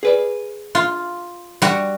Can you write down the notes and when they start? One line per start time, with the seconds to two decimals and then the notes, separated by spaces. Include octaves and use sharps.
0.03 G#4 B4 D5
0.75 F4
1.62 G3 F#4